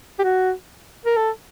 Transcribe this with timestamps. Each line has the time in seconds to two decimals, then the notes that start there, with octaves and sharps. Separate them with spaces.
0.19 G4
0.24 F#4
1.05 A#4
1.16 A4